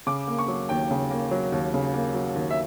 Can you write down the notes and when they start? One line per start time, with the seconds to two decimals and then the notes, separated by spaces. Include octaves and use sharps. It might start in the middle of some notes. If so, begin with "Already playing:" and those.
0.07 C#3 D6
0.28 A#3
0.39 C#6
0.48 F#3
0.69 D#2 G5
0.91 C#3
1.11 A#3
1.31 F#3
1.52 D#2
1.74 C#3
1.94 A#3
2.15 F#3
2.35 D#2
2.51 E5